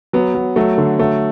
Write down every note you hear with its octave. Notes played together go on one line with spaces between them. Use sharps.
F#3 B3
F#3
F#3 A3
D3
F#3 A3